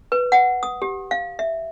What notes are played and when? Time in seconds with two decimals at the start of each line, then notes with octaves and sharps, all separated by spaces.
0.12 B4
0.32 F#5
0.63 D#6
0.82 G4
1.11 F5
1.39 E5